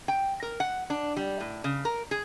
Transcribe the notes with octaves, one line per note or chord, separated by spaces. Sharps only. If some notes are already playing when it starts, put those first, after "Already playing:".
G5
A#4
F#5
D4
G3
A2
C#3
A#4
G#4